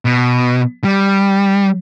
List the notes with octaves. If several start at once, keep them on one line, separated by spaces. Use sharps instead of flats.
B2
G3